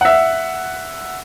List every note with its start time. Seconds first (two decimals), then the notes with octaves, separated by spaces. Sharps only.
0.01 E5 F#5